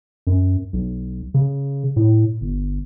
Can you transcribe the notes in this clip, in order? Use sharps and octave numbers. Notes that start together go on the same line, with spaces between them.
F#2
B1
C#3
A2
G1